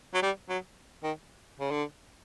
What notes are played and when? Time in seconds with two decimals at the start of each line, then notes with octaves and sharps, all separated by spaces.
0.14 F#3
0.22 G3
0.49 F#3
1.04 D#3
1.60 C#3
1.71 D3